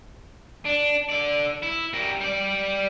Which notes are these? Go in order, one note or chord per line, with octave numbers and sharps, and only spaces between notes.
D4
D3 D5
E4
G3 A#4
G3 D5